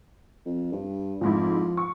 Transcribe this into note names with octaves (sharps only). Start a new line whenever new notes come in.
F2
G2
F2 G#2 F3 E4
C#6